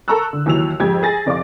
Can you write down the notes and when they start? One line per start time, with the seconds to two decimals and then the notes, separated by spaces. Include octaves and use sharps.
0.08 A4 A#4 A#5 C#6 E6 F#6
0.33 D3
0.46 D#2 E3 F#3 E6 F7
0.80 F2 G#2 G4 G5 G#6
1.03 G#4 G#5 A6 A#6
1.26 F1 D5 F5 D6